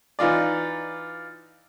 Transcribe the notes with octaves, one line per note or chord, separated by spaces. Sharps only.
E3 D#4 F4 D5